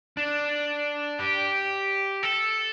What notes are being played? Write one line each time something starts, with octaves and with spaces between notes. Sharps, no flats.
D4
G4
A4